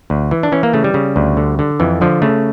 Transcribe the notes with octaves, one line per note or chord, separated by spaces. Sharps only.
D2
E3
D4
E3 C#4
A#3
C#3 A3
G3
C#3
D2
D3
D3
F2 E3
D3 F3
C#3 A3